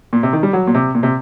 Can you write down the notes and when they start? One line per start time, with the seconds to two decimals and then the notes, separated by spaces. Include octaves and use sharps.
0.13 A#2
0.23 C3
0.33 D#3
0.43 G3
0.53 F#3
0.67 A#2
0.75 C3
0.95 A#2
1.03 C3